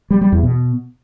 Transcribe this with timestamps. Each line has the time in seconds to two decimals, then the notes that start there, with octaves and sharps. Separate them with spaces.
0.10 G3
0.21 G3
0.32 E2
0.43 B2